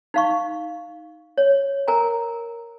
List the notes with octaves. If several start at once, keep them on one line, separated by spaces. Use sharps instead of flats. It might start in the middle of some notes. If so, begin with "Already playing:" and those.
D#4 F5 C#6
C#5
A#4 G#5 A#5